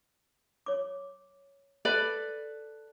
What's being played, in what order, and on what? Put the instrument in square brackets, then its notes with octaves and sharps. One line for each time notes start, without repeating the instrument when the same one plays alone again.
[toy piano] C#5 D6
[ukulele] A4 B4 D5